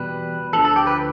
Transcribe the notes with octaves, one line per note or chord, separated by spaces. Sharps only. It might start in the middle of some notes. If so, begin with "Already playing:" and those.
Already playing: E2 B2 G3 B4
D2 D3 F3 A4
A4
G4
B4